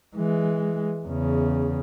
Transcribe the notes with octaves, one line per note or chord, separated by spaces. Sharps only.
E3 G#3
E2 C#3